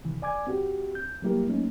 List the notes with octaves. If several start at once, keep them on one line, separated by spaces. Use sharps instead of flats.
C3 D#3 E3
D5 G#5 D6 G#6
C4 F#4 G4
G6
F#3 G3 A#3 E4 G4 A#4
F#3 A3 A#3 C#4 D#4